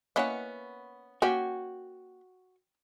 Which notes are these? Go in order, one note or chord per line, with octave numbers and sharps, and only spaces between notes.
A#3 B3 C#4 E4 D#5 F#5
A#3 C#4 F#4 G4 G5 G#5